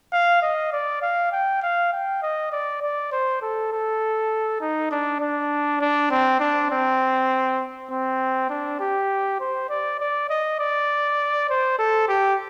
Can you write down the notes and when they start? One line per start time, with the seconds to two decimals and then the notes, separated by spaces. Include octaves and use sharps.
0.13 F5
0.42 D#5
0.73 D5
1.02 F5
1.32 G5
1.63 F5
1.93 G5
2.23 D#5
2.52 D5
2.82 D5
3.12 C5
3.42 A4
3.72 A4
4.61 D#4
4.92 D4
5.21 D4
5.81 D4
6.11 C4
6.40 D4
6.71 C4
7.91 C4
8.50 D4
8.80 G4
9.40 C5
9.70 D5
10.00 D5
10.30 D#5
10.60 D5
11.50 C5
11.79 A4
12.08 G4